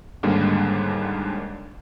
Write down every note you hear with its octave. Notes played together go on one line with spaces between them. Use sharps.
D#2 G#2 D3 G3 A#3 D4